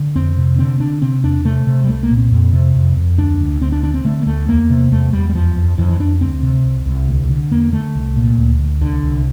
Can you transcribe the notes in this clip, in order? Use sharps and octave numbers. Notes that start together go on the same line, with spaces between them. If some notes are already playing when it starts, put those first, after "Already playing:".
Already playing: D3
F2 C4
C3
D3 C4
D3 D4
C3 C4
E2 D4
C3 A3
C3
G3
C2 A3
A#3
A#2
C4
F2
C3
F2
F2
D2 D4
D2
D2 C4
D4
D3 D4
C4
D3 A3
A#3
D2 A3
E2 A#3
C3
E2 A3
E2 G3
G3
F2 F3
F2
F2 E3
E3
F2 D4
D2 C4
C3
C2
C2
D2
D3
E2 A#3
D3 A3
C2
A#2
D2
D2
C2 D3
C2